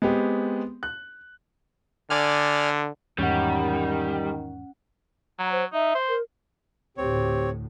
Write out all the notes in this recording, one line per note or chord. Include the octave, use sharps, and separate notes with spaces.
G#3 B3 C4 G4
F#6
D3 D5 G#5 F6
E2 G#2 D#3 G3 C#4 F#5
F#3 A#5
C5
D#4 E5
C5
A#4
D2 A2 C4 G4 C#5